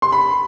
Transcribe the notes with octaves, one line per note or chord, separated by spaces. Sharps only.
C6
B5